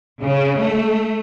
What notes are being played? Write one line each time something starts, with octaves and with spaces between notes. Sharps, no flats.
C#3
A3